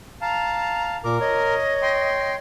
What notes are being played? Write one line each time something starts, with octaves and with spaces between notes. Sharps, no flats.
F5 A5 A#5
A#2 A#4 D6
C#5 D#5
G5 C6